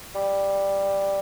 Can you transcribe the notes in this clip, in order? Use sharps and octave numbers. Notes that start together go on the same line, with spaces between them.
G3